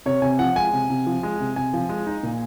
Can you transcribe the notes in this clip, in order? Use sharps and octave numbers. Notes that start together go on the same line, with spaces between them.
C3 C#5
C3 G#5
F3 F#5
G#3 G#5
C3
C3
F3
G#3
C3
C3 G#5
F3
G#3
D#4
A#2